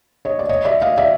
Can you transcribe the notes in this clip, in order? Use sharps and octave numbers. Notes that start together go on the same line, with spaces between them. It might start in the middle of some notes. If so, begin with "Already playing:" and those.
C#5 D#5
D5
C#5 D#5
D5 E5
D#5 F5
D5 E5